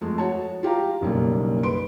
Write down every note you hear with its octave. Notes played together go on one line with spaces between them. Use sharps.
F2 G#3 A3
F#4 C#5 A5
F4 G4 F5 A#5
F#1 B1 G3 A#3
B4 C6 D7